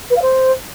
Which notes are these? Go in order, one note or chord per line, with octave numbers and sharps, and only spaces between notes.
B4
F5
C5